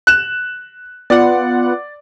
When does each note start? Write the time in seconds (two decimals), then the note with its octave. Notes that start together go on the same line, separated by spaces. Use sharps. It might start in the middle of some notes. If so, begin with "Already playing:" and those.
0.07 F#6 E7
1.10 B3 F4 D5 F#5